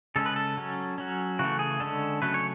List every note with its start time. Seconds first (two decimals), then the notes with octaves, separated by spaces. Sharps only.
0.16 C#3 G#3 C#4 A4
0.26 B4
0.36 A4
0.57 F#3 C#4
0.98 F#3 C#4
1.39 C#3 E3 A3 F#4
1.59 G#4
1.80 D3 G#3 C#4 A4
2.22 C#3 F#3 A3 C#4 B4
2.34 C#5